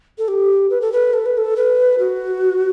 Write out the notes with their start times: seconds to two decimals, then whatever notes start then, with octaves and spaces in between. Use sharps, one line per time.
0.18 A4
0.28 G4
0.70 B4
0.81 A4
0.92 B4
1.14 A4
1.26 B4
1.38 A4
1.56 B4
1.99 F#4